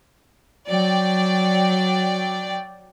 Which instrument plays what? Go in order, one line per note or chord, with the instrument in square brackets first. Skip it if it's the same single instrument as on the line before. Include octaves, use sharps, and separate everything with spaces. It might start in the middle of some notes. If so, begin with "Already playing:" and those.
[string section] F#3 D5 G5